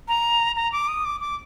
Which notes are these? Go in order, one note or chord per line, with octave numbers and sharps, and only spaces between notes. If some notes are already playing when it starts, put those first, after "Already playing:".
A#5
A#5
D6
D#6
D6
D6